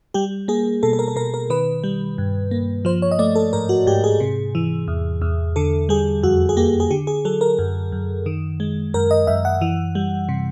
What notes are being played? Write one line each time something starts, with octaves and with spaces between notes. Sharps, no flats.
G3 G4
A#3 G#4
B2 A4
A4
A#4
A4
B2 A#4
A#4
D#3 B4
G3
G2
A#3
F3 C5
C#5
D#5
A3 D5
A4
G#2 A#4
F#4
G#2 G4
G#4
C3
E3
E2
E2
D3 A4
G3 G#4
F2 F#4
G#4
A#3 G4
G#4
D3 G4
G#4
F#3 A4
A#4
F#2
F#2
D#3
G#3
F#2 A#4
D#5
F#2 E5
F#5
E3
G3
C3